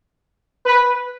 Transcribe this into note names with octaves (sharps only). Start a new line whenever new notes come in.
B4